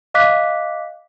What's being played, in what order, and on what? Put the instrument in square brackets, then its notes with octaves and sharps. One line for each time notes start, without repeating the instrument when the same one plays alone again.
[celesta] D#5 F5 D6 F#6 B6